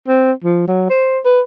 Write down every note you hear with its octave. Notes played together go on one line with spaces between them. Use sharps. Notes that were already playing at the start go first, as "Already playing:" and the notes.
C4
F3
F#3
C5
B4